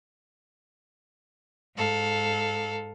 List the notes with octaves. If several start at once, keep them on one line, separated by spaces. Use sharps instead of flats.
G#2 A4 F5